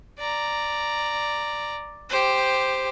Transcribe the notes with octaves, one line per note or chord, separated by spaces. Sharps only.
D5 A#5
G4 C5